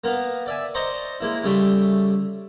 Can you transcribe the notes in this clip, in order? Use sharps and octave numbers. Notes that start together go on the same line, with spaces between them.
A#3 B3 F5
D5 E5 G#5
C5 D5 D#5 A#5 C6 C#6
G#3 A#3 E4
C#3 G3 A3 E5 C6 D6